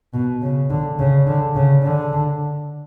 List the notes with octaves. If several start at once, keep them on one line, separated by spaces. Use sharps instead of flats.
B2
C#3
D3
C#3
D3
C#3
D3